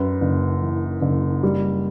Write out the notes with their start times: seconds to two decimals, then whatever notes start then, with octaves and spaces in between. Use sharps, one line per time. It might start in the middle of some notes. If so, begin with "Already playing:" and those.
Already playing: F#2 B4
0.21 F#1
0.62 E3
1.02 F#1
1.43 G3